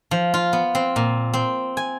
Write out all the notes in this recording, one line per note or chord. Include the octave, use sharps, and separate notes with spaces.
F3
F4
B3
C4
A#2
C4
G#5